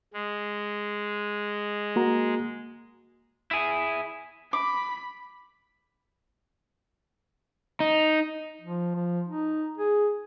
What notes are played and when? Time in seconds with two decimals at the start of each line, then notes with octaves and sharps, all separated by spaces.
0.14 G#3
1.96 A#3 F#4 A#5
3.51 E4 G#4
4.53 B5 D6
7.80 D#4
8.62 F3
8.95 F3
9.28 D#4
9.78 G#4